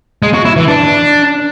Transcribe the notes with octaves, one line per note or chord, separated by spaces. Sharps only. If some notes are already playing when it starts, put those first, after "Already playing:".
G#3
F#4
E4
E3
D4